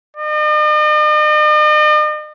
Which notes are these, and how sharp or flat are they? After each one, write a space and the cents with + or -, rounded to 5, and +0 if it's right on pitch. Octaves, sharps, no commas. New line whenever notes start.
D#5 -45